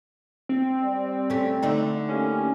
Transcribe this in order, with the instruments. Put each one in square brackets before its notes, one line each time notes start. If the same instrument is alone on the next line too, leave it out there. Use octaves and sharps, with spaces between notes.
[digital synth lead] C4
[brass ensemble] G3 D5
[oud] A3 C#4
D3 A3 D#4
[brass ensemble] A#3 E4 G4 [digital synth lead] C#4